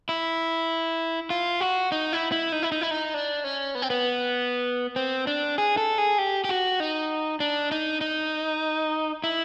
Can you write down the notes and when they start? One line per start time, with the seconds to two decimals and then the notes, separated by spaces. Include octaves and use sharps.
0.09 E4
1.30 F4
1.61 F#4
1.92 D#4
2.13 E4
2.32 E4
2.52 D#4
2.63 E4
2.72 D#4
2.81 E4
2.91 D#4
3.14 D4
3.44 C#4
3.75 B3
3.82 C4
3.90 B3
4.96 C4
5.27 D4
5.58 G#4
5.77 A4
5.98 G#4
6.18 G4
6.44 G4
6.49 F#4
6.80 D#4
7.40 D4
7.71 D#4
8.01 D#4
9.24 E4